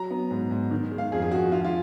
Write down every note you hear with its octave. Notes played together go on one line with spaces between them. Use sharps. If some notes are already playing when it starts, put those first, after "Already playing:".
Already playing: F#3 A#5
B3
G#2
G#2
D#3
G#3
F5
F2 G#4
G#4
F2 F#4
F3 F4
F4